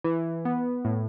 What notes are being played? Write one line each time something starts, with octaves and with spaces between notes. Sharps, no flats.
E3
B3
A2